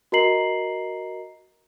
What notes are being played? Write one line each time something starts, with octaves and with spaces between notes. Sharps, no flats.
F#4 A#4 D#5 A#5 C7 F#7